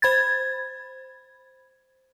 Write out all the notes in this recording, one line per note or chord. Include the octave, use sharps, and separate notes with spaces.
C5 B5 G#6 A6